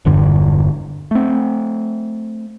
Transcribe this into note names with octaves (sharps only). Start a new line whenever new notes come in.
E1 G2 D3
A3 C4